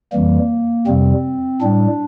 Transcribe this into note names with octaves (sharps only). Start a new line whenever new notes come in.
F2 E3 G3 A#3
F2 C3 G3 C4
A2 G3 D4